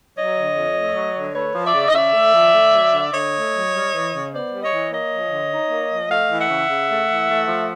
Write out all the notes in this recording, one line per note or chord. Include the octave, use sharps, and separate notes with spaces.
F#3 C#5 D#5
D3
F2
A3
F#3
D3
A3 B4 C#5
F3
D5 E5
C#3
D#5
C#3 D5 E5
A3
F3
A3
F#3
D3
D3 C#5 D#5
A3
F#3
G3
E3
C#3
B3 C5 D5
G3
C#5 D#5
E3
A#3 C#5 D#5
F3
D3
D#4
A#3
F3
A3 D#5 F5
E3
E5 F#5
C#3
C#3
A3
E3
A3
F3